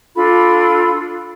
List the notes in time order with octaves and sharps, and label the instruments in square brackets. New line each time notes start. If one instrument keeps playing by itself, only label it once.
[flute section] D4 F4 A4 B5